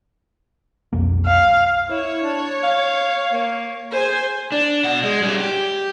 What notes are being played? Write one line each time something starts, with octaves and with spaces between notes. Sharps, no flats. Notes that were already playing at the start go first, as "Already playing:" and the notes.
B1 F2 A#3
F5
E4 C#5
D4
F5
A#3
G#4 C5 G#5
D4
B2 F#5
G#3
G3 C#4
G4